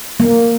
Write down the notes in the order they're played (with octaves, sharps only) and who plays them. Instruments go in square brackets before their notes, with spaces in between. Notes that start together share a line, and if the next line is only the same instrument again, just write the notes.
[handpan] A#3